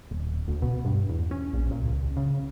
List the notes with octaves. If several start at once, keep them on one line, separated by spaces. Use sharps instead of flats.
D#1
D2
B2
G2
E2
C#4
A#1
A#2
C#2
C#3